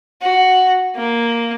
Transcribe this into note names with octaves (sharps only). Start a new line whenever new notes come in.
F#4
A#3